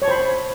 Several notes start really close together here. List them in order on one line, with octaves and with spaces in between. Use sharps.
C#5 A5 C5 B5